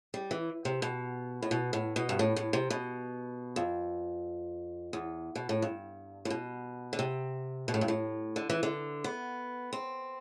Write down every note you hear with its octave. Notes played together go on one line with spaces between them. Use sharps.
G3
E3
C3
B2
A2
B2
A2
B2
G2
A2
A2
C3
B2
F2
E2
B2
A2
G2
A2
B2
D3
C3
B2
A2
G2
A2
D3
E3
D3
B3
C4